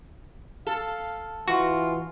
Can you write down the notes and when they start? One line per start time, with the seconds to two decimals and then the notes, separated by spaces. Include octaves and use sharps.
0.67 A4 F5
1.48 E3 F4 F#4